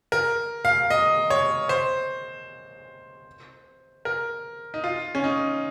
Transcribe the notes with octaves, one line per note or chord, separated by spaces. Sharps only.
A#4
F5
D#5
C#5
C5
A#4
D#4
F4
C#4
D#4